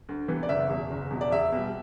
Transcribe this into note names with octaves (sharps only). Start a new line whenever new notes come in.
D2
C3 E3 B3
D5
F#1 E5
E2 B2
F#1
E2 B2
D5
E2 E5
B2 G3